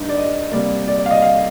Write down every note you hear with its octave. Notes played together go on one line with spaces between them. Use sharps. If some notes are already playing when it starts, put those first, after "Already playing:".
Already playing: G2 D4 D#4
D5
D#5
C3 G3 A#3 D5
D5
D5
F5
D#5
F5